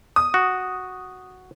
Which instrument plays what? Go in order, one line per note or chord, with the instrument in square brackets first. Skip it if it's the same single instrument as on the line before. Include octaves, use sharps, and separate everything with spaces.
[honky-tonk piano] D#6
[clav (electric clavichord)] F#4